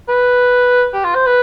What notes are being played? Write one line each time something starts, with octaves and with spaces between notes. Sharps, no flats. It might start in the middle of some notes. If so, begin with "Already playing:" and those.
B4
G4
F4
C5
B4